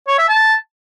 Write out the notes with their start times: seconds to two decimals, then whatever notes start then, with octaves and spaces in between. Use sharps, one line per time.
0.08 C#5
0.19 E5
0.29 A5